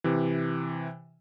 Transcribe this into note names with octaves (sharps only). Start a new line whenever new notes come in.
C3 E3